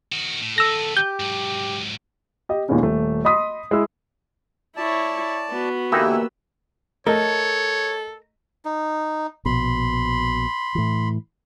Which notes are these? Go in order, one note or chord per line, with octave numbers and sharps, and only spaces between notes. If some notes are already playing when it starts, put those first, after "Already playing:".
D#3 F#4
A2
D#3 B3 A4 E6 A#6
G4 G6
G#2 F#3
G4 D#5
D#2 A#2 D#3 G#3 B3 C#4
D#1 A3
D#5 B5 C6 D#6 B6
G#3 E4 E6
E4 C#5 D5 A5
B3 F#4
D3 E3 A#3 D#4 E4 G4 D#5 E6
A3 A4 A#4 C#5 D#5
D#4
A#1 B2 B5 C6
A2 E3